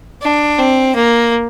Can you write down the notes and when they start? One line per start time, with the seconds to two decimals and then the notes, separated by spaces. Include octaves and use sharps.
0.22 D4
0.59 C4
0.95 A#3